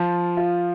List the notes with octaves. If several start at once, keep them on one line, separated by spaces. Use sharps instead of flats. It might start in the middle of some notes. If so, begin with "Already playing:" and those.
Already playing: F3 F4
F4